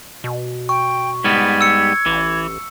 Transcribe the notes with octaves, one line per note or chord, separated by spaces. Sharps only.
B2
G5 C#6
G#2 G3 B3 G#6
E6 C#7
A1 E3